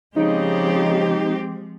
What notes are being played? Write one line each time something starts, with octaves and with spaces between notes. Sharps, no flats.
C#3 F3 G#3 C4 D#4 G4